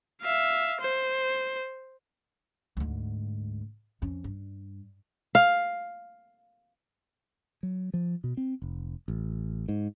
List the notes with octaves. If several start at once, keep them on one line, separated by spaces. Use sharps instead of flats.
E5 F5
C5
D2 G#2
F2 C#4
G2
F5
F#3
F3
B2
C4
F1
A1
G#2